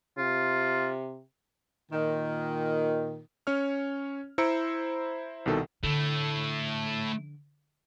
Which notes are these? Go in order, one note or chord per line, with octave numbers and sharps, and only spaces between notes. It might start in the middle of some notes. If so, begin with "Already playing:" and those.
C3 F4
A#2 D#3
C#4 C#5 F6
E4 C5 A#5 E6 C#7 D7
C2 B2 D#3 A4
D3 A3 E4